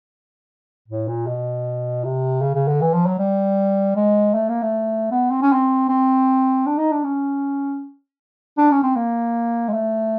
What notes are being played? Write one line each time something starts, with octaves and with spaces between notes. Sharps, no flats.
A2
A#2
B2
C3
C#3
C#3
D3
E3
F3
F#3
G3
G#3
A3
A#3
A3
B3
C4
C#4
C4
C4
D4
D#4
D4
C#4
D4
C#4
C4
A#3
G#3
A3